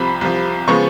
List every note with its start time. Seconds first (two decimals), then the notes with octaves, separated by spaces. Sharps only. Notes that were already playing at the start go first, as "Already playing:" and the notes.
Already playing: C2 C3 F3 B5
0.21 C2 C3 F3
0.68 C#3 F3 G#3 B3 C#6